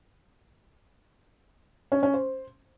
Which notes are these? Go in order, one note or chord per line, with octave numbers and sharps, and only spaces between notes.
C#4
C#4
C5